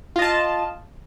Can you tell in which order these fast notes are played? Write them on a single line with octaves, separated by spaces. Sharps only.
F4 D#5 A5